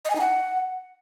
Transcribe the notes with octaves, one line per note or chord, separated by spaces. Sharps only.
D#5
G#5
D#4
F#5